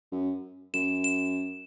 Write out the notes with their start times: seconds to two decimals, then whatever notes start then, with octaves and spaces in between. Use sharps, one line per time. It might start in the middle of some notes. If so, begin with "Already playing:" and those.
0.12 F#2
0.74 F#2 E7
1.04 E7